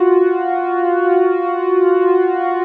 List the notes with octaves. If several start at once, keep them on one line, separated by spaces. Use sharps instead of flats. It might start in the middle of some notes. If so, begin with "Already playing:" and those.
Already playing: F4 F#4